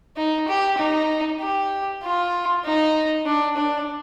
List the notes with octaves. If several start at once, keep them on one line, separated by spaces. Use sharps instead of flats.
D#4
G4
D#4
G4
F4
D#4
D4
D4